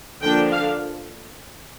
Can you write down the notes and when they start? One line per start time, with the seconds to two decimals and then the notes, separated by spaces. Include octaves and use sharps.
0.21 D3 F3 A#3 D4 G5
0.51 F5